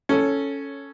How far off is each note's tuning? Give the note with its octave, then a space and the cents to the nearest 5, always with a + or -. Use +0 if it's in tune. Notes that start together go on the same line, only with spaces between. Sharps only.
C#4 +0 A4 +0 C#5 -10